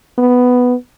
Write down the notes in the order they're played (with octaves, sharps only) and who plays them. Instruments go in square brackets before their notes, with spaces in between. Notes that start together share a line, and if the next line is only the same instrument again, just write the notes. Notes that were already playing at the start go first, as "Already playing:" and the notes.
[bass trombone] B3